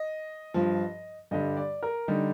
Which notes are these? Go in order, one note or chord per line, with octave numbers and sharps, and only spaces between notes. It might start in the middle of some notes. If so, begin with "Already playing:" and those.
Already playing: D#5
G2 F3
G2 D3 G3 D#5
D5
A#4
D3 G3 D#4